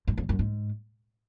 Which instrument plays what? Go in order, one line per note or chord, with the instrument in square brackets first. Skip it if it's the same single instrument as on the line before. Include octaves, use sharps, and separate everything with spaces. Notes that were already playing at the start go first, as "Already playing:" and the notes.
[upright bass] F#2
F2
F#2
G#2